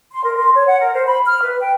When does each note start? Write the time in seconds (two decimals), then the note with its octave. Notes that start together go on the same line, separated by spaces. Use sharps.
0.12 C6
0.24 A#4
0.37 C6
0.55 C#5
0.67 F#5
0.80 A#4
0.93 C5
1.07 B5
1.26 F6
1.42 B4
1.60 G5